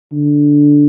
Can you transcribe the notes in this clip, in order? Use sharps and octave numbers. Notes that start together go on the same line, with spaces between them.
D3